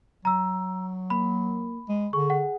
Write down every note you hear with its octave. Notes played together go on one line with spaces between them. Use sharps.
F#3 A#5 E6
A#3 B5
G#3
D3 G#4 C#6
F#5